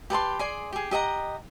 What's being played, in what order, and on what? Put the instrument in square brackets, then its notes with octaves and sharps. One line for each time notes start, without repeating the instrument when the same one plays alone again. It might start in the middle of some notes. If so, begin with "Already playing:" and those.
[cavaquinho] G4 B4 A5 C6
G#4 D5 C6
G4 G#4
G4 D#5 F#5 A#5